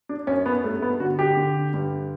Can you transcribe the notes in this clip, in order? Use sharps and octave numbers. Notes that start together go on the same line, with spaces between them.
D4
F#2 C#4
B3
G2 A3
B3
D3 F#4
G4
D3
G2